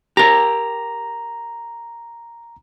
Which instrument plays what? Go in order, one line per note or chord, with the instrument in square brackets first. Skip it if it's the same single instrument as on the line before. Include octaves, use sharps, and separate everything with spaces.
[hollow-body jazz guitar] G4 A#4 [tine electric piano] A#5